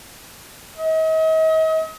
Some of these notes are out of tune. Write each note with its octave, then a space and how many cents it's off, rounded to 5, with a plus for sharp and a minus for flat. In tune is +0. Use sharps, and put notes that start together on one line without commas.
D#5 +40